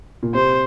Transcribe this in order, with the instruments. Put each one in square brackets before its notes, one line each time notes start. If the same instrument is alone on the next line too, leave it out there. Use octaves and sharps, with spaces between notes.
[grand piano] A#2
[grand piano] C3 [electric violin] C5